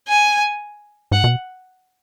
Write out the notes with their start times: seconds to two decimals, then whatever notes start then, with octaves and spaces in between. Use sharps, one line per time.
0.09 G#5
1.11 G#2 F#5
1.24 B2